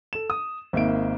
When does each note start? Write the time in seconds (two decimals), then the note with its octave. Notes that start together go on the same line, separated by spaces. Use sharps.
0.13 A4 E7
0.30 D#6
0.73 G#1 D#3 A#3 E5 D7